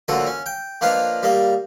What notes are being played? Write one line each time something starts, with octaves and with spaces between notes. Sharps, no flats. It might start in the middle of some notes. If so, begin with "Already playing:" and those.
A#2 D3 F3 F#3 A4
C#4
G5
F3 A#3 D4 B4 D#5 F5
G3 A#3 D#5